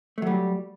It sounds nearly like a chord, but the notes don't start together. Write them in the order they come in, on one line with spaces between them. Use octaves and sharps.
A3 F#3 G3